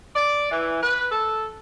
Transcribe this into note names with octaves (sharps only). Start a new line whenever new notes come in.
D5
E3
B4
A4